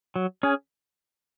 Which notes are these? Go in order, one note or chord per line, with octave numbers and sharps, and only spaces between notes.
F#3
C#4 G#4